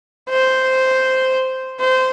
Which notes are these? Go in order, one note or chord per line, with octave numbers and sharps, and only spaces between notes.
C5
C5